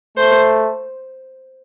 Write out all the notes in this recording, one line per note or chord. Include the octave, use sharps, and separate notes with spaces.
A3 C5